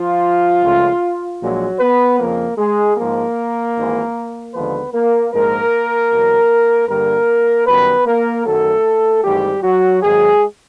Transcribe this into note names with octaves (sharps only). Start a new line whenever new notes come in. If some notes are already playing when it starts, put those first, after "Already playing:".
Already playing: F3 F4
C#2 C#3 F3 A3
A#1 A#2 F3 F#3 G#3 F#4
B3 B4
F2 C#3 F3 A#3 A#4
G#3 G#4
G#2 F3 G#3 A#3 A#4
G#1 G#2 E3
D#2 D3 F3 G#3 B3 B4
A#3 A#4
A#1 G#2 F3 G#3 A#3 A#4
E2 B2 F#3
G2 D3 G3 A#3 A#4
F#2 D#3 G3 B3 B4
A#3 A#4
F#2 D#3 F#3 A3 A4
G#1 G#2 E3 G3 A3 G4
F#3 F#4
G#1 G#2 D#3 F#3 G#3 G#4